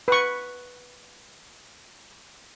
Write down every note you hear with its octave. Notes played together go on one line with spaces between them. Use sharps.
B4 C#6